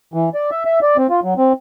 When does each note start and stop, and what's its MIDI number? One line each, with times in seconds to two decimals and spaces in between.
0.14 0.29 52
0.34 0.50 74
0.51 0.64 76
0.65 0.79 76
0.82 0.97 74
0.97 1.07 60
1.10 1.20 65
1.24 1.34 54
1.38 1.53 60